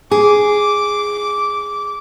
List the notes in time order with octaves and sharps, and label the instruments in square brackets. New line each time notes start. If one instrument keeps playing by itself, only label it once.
[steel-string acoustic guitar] G#4 [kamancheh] D6